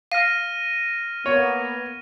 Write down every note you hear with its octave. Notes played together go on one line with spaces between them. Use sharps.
F5 F6 A#6 D#7
A#3 B3 C#5